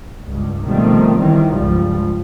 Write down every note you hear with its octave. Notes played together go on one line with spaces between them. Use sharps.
C#2 G2
B2 D#3 F3 G3 A3 C4
D#3 E3 F#3 G3
C#2 G2 F3 G3